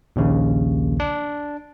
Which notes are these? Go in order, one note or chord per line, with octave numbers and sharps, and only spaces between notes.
A#1 D#2 C#3
D4